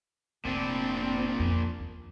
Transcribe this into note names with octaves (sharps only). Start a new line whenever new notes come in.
F1 A#2 C4 D4
F2
D#2